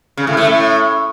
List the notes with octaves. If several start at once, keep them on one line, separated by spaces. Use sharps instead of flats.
C#3
A2
A3
A2